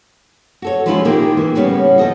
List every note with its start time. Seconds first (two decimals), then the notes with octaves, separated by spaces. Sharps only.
0.62 F#4 A4 C#5
0.86 F3 G#3 B3 C#4 E4 F4
1.05 A#2 D#3 A#3 G4 G#4
1.37 E3
1.55 A2 C#3 G3 B3 C#4
1.99 F3 A4 D#5